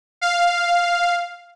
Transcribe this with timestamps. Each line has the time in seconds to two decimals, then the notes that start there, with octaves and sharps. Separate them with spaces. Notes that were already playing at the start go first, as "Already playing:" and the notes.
0.21 F5